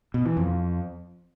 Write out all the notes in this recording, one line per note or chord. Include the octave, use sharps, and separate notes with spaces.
B2
E3
F2